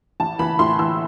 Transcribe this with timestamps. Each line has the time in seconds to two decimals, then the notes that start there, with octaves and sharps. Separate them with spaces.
0.20 A1 A5
0.39 E3 B5
0.59 A2 C6
0.79 E3 E6